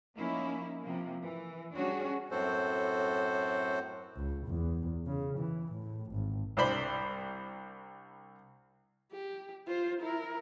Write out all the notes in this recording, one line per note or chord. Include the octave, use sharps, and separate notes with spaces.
F3 A#3 C#4 D#4 E4
C3 F3 A#3
E3
G3 C#4 D4 F#4 G#4 C#5
F#2 A2 C4 F#4 A4 C5
C#2
E2
C#3
E3
A2
G#1
C2 D4 C5 B5
G4
F4 C5
E4 A#4